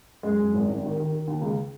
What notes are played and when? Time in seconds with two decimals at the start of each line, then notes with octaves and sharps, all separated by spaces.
0.23 F#2 G#3
0.39 F#2
0.53 G#1
0.69 G#1
0.83 D#3
0.97 D#3
1.13 D#3
1.27 D#2
1.42 C#2